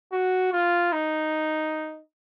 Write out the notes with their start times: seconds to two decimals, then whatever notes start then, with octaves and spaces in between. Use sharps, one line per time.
0.12 F#4
0.53 F4
0.92 D#4